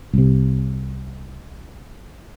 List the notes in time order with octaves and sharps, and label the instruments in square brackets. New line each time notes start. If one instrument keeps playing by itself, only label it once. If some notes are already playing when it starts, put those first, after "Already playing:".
[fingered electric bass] C2 C3